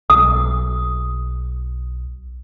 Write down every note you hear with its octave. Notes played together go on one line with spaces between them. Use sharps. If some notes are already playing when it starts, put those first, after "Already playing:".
B1 D#6